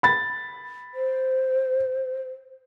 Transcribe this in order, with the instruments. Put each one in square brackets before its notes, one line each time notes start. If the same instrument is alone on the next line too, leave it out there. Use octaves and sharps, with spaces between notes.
[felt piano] B5 A6
[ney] C5